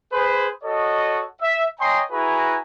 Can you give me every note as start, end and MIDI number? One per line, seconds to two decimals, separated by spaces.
0.12 0.48 68
0.12 0.48 71
0.12 0.48 72
0.64 1.24 66
0.64 1.24 69
0.64 1.24 73
0.64 1.24 75
1.41 1.65 76
1.79 2.02 73
1.79 2.02 75
1.79 2.02 79
1.79 2.02 80
1.79 2.02 82
1.79 2.02 84
2.11 2.57 64
2.11 2.57 66
2.11 2.57 68
2.11 2.57 71
2.11 2.57 80
2.11 2.57 82